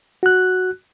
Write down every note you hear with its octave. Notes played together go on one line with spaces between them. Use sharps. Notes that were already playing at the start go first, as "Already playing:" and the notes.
F#4 F#6